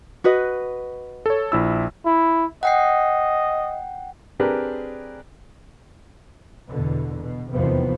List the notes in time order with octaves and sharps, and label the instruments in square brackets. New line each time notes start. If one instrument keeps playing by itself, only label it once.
[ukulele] F#4 B4 D#5
[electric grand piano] A4 C#5
A#1 E4 E6
[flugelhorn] E4
[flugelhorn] D#5 [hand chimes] F#5 G5 C7
[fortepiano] C4 D4 G4 G#4 A#4 B4
[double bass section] E2 B2 D3
B2
F1 E2 C3 D#3 F3 B3